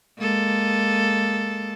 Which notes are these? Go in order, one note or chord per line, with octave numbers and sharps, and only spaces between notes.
G#3 A#3 A4